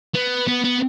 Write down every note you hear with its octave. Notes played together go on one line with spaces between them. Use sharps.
B3
B3
B3